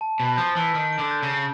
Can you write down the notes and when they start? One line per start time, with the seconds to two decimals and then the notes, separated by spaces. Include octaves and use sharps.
0.01 A5
0.19 B2 A5
0.37 F3 G6
0.56 E3 A5
0.74 D#3 D7
0.93 D7
0.99 D3
1.11 G6
1.23 C#3
1.29 G6